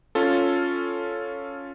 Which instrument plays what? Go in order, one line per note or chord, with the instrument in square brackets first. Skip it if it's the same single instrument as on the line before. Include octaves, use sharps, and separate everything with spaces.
[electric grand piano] C#4 F4 A4